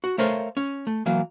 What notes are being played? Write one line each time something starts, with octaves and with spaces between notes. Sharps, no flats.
F#4
A3 A4 A#4 C5 C#5 F5
C#4
A3
E3 F#3 A#3